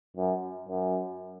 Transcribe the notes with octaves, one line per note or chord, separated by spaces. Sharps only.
F#2
F#2